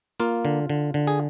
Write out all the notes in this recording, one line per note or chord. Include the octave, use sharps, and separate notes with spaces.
A#3 F4
D3
D3
D3
G#4